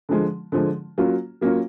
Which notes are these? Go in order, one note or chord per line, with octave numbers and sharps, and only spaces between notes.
D3 F3 G#3
D3 F3 G#3
F#3 A#3 C#4 F4
F#3 A#3 C#4 F4